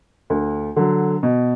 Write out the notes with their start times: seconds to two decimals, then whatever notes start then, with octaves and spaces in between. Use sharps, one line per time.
0.30 D2
0.76 D3 F#3
1.23 B2